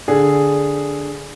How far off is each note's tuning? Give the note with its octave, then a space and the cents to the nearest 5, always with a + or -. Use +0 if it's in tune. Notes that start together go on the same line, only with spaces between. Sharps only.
D3 -5 G#4 -5